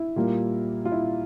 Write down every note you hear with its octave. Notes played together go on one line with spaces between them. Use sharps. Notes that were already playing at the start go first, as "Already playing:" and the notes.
Already playing: E4
A#2 G3 A#3
F4
E4